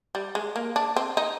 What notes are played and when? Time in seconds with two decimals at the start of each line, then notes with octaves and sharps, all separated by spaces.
0.15 G3
0.35 G#3
0.56 A#3
0.76 D4
0.96 C4
1.17 D#4